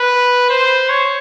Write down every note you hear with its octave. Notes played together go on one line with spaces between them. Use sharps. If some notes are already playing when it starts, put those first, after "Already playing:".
Already playing: B4
C5
C#5